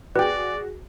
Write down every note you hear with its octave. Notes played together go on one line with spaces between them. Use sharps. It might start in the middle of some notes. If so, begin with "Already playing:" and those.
F#4 G#4 B4 D5 G5